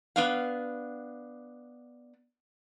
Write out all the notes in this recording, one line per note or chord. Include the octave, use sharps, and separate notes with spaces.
B3 D4 F5